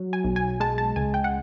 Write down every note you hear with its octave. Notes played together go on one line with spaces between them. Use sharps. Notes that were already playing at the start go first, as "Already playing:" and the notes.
Already playing: F#3
G#5
B1
G#5
G#3 A5
A5
C#2 G#5
G5
F#5